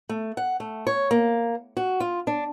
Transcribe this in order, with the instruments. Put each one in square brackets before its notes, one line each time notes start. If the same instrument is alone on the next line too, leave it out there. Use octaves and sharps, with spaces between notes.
[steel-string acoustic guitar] A3
F#5
A3
C#5
A#3
F#4
F4
D4